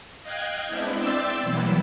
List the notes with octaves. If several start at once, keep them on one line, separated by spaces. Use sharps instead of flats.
D#5 F5 G5 F#6 G#6
G#3 B3 C4 D4 E4
D5 E5 G5 C6 E6 A6
B2 E3 F#3 G3 A#3 E4